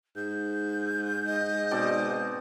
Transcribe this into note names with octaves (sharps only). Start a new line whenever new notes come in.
G#2 G6
D#5
B2 C4 D5